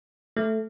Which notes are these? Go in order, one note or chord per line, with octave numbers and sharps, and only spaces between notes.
A3